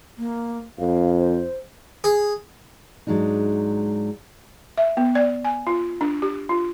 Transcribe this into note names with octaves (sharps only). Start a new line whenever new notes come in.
A#3
F2 F5
C5
G#4
G#2 F#3 G#3 D4 D#4
E5
B3
D5
G#5
F4
D4
G4
F4